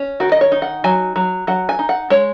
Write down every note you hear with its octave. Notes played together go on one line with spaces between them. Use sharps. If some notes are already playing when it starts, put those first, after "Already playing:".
Already playing: C#4
D#3 F#4
D#5
C#5
D#4
F#5
F#3 G#5
F#3
F#3 F#5
G#5
D#4
F#5
G#3 C#5